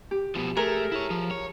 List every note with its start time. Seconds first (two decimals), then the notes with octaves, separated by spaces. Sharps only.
0.11 G4
0.35 B2 F3
0.57 A3 G#4 A#4
0.92 E4 C#5
1.10 F3
1.31 C#5